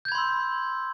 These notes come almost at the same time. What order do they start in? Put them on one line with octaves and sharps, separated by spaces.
G6 G#6 B5 C6 E6